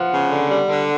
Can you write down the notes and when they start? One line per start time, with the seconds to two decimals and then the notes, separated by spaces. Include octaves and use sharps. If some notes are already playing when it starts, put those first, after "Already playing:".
Already playing: F3 F#5
0.09 C#3
0.29 D3
0.50 G3
0.69 D3